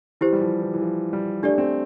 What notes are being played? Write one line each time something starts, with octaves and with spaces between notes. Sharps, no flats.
E3 E4 G4 C5
G3
F3
E3
E3
F3
G3
A3 D4 G4 D5
C4